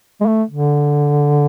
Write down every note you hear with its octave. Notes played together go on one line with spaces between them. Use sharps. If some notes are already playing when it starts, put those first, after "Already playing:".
G#3
A3
D3